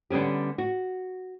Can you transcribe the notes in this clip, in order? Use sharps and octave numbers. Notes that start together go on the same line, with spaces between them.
D3 G3 B3 C#4 G4
F#4